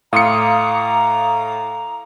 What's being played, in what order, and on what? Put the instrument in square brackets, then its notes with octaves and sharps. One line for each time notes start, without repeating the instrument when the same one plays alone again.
[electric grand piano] A2 C6 C#7 [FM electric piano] F5 D6 D#6 [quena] A#5